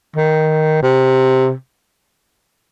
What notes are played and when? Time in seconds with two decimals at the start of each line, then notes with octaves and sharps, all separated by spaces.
0.17 D#3
0.83 C3